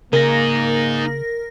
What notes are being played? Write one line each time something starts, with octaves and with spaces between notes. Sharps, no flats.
C#3 A#3 D#4 G#4 A#4 A#6